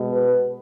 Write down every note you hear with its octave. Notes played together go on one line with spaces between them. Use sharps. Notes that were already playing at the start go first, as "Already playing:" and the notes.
Already playing: B2 G#3
B4